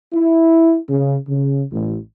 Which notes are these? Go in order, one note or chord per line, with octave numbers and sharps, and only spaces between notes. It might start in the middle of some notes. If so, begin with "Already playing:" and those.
E4
C#3
C#3
A1